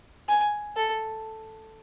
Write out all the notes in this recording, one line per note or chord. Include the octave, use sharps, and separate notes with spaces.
G#5
A4